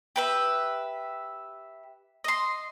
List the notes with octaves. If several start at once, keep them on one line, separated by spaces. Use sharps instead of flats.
G4 B4 E5
D#5 C6